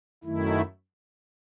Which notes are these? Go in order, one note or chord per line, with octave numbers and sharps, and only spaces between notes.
F#2 D#3 A3 E4